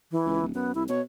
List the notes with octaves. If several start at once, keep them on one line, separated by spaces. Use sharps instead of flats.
E3
C#2
D1
F#2 B3
C2 E4
B2 C#5